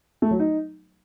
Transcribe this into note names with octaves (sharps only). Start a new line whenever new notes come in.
A3
F#3
D#4